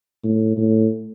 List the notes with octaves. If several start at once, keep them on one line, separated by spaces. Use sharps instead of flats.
A2
A2